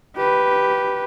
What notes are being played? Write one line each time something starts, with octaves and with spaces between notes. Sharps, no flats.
G4 B4